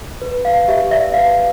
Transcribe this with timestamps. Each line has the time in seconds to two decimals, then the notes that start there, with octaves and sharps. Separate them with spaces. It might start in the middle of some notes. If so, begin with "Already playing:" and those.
0.22 B4
0.44 B4 F5
0.68 G4 E5
0.91 D5 E5
1.14 B4 F5